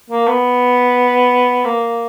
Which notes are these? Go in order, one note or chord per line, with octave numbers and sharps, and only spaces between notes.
A#3
B3
A#3